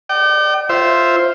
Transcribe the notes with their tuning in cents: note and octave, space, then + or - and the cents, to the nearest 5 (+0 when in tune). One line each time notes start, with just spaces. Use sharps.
D5 +30 G5 -35
F4 +0 C5 +0 E5 -5